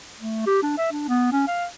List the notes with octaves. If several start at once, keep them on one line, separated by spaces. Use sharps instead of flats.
A3
G4
D4
E5
D4
B3
C#4
F5